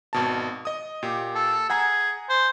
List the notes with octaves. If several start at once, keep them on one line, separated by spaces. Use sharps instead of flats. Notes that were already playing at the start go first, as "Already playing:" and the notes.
G#1 B2 A5
D#5 D#6
A#2 G4
A4
G#4 F#5 G#5 A#5
C5